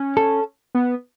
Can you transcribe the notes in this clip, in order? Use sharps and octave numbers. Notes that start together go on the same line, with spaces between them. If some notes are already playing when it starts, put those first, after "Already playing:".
Already playing: C#4
A4
B3